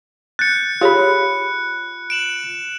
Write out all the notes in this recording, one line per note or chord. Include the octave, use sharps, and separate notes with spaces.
F#6 G6 A6 C#7
F4 G4 G#4 C#5 B5
D7 E7 F#7